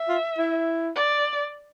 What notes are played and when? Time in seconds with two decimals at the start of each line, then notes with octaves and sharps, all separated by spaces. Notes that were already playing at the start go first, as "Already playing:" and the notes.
Already playing: E5
0.08 F4
0.38 E4
0.96 D5